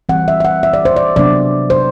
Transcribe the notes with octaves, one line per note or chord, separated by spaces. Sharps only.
E3 G3 C4 F#5
E5
E5
F#5
E5
D5
C5
D5
C3 F#3 B3 D4 D5
C5